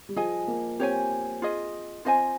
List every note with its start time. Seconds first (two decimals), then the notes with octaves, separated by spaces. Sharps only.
0.09 G3
0.16 F3 G#4 D#5 G#5
0.48 A#3
0.79 C4 G4 C#5 G#5
1.42 F4 G#4 D#5
2.05 C4 F4 C5 D#5 G#5